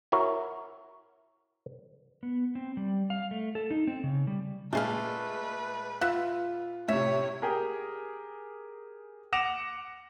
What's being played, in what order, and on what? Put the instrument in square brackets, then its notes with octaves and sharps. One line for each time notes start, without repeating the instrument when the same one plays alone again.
[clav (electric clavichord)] E4 F#4 A#4 C#5
[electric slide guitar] B3
C4
G3
F5
A3
A4
D#4
C4
C#3
G3
[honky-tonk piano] A#2 G#3 [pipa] A3 G#4 F5 [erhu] B4
[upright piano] F4 [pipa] E5 F#5
[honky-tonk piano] A2 C3 [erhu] C#5 [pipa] E5
[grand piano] G4 G#4 A#4
F#5 D6 A#6 E7 F7